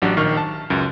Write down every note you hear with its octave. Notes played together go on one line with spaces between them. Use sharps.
A1 F#3 D4 F#4 G4 G5
A#1 D#3 C#6 F6
A5
C#2 F#2